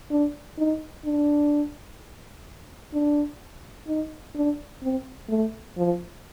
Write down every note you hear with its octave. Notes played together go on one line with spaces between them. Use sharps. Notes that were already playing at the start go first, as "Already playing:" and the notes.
D4
D#4
D4
D4
D#4
D4
C4
A3
F3